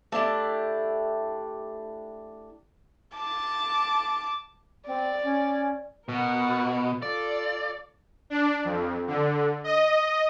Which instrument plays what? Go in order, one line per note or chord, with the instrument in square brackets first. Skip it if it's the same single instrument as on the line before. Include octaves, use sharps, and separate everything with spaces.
[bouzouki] A3 D4 E4 G4
[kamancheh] A5 D6
[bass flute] C4 [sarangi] D5
[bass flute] C#4
[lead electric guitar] B2 [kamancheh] A#4 F#5
[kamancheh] F4 A4 [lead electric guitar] D5
[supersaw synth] D4
F2
D3
D#5